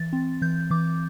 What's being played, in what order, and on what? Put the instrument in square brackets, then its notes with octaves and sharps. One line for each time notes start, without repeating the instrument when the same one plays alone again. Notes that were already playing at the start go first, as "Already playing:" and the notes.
Already playing: [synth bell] E3 A6
C4
E3 G6
E3 D6